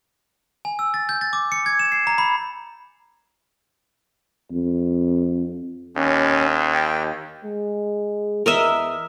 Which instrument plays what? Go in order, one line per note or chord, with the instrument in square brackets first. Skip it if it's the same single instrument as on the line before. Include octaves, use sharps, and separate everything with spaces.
[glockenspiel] G#5
E6
A6
G6
A6
D6
C#7
G#6
E7
C7
A#5
B5
[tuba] F2
[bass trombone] D#2 [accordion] C#4
[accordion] G5
[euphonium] G#3
[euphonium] E2 [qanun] A#4 D#5 E5